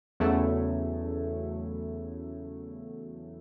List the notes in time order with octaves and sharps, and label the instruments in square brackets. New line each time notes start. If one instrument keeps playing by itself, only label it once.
[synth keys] E2 C#3 F#3 A3 E4